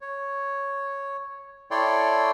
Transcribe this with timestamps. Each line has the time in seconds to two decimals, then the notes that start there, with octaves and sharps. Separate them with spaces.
0.01 C#5
1.71 E4 A4 C#5 D5 G5 C6